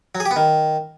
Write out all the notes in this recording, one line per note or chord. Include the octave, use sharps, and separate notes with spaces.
F#3
G#4
G4
B3
D#3